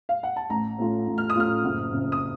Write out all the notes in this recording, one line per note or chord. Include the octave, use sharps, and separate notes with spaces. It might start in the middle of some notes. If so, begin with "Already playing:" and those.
F5
F#5
A5
A1 A#5
A2 A3 C#4 F4
A1
F6
D#6
A2 A3 C#4 F4 F6
F#1
F2 C#3
D#6